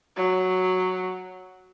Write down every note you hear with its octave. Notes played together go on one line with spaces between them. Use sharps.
F#3